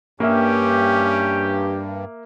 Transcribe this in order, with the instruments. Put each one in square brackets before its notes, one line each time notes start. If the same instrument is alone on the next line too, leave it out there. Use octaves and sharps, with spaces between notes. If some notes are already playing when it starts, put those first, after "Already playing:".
[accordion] G2 [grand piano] A#3 E5 [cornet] C#4 [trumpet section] G4